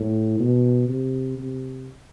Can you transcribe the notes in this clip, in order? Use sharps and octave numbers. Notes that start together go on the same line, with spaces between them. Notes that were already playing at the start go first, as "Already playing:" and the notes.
Already playing: A2
B2
C3
C3